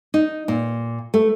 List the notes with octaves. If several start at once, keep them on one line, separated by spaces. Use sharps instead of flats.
D#4
A#2
A3